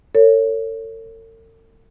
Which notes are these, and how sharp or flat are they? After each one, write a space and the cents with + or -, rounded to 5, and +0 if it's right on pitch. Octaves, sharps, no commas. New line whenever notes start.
A4 +45 C#5 +0